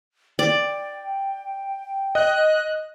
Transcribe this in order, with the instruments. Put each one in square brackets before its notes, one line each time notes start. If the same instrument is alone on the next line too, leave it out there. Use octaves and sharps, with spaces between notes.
[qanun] D5 [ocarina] G5
[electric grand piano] D#5 [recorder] F#6